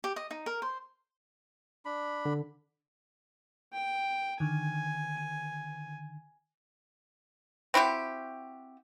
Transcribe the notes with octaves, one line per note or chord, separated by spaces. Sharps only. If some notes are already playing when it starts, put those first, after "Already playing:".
G4
D#5
D#4
A#4
C5
D4 B5
D3
G5
D3 D#3 G#5
C4 E4 F#4 G4